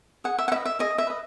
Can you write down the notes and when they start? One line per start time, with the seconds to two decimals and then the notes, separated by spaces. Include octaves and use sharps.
0.24 G#4 F#5
0.39 E5
0.48 F#5
0.52 B4 D#5 E5
0.65 E5
0.79 G#4 D#5
0.98 E5
1.07 B4 D#5